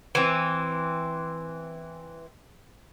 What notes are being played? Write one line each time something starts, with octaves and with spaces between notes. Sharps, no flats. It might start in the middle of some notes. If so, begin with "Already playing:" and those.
E3 C4